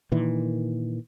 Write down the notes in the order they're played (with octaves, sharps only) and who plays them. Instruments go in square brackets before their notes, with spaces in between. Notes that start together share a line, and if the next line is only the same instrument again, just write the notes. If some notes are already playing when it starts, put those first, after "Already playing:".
[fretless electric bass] A#2 D#3 E3